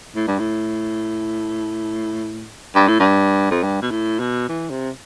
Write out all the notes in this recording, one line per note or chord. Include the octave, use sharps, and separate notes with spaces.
A2
G2
A2
G2
A2
G2
F2
G2
B2
A2
B2
E3
C3